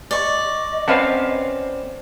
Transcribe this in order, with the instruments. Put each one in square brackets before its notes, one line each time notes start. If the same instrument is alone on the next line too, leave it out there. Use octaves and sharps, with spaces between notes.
[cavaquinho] D5 C#6 [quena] D#5
[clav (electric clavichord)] C4 C#4 F#5 [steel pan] B4 F5 A5